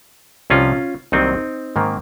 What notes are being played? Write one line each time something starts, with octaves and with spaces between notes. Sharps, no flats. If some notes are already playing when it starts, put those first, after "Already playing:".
C2 C3 F3 C#4 F4
C2 C3 D#3 F#3 A#3 C4 D#4
G#2 D#3 A#3